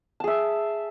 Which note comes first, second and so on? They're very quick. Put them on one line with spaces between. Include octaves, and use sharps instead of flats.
A5 G#4 E5